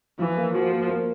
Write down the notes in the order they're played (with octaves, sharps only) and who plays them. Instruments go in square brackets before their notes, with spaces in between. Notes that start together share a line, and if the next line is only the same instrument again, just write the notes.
[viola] E3 [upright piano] F3
[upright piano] A#3
[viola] F3 [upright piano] F#4
[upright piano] A#3
A#3